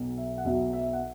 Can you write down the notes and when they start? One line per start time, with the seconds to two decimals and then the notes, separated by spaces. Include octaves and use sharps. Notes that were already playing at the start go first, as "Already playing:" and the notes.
Already playing: B1 B2 F#3
0.17 E5
0.38 F#5
0.45 B1 B2 F#3 E5
0.73 E5
0.93 F#5